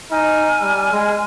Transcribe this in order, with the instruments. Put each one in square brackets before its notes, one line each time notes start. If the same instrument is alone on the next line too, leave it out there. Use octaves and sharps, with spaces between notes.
[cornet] D#4 [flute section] G#5 F6
[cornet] G3
G#3